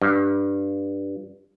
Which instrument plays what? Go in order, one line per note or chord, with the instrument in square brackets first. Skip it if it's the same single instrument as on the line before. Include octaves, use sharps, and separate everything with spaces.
[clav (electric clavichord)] G2